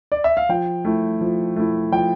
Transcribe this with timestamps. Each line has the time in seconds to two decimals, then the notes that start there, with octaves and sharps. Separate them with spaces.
0.12 D5
0.24 E5
0.37 F5
0.49 F3 G5
0.85 A3 E4
1.21 F3
1.56 A3 E4
1.92 F3 G5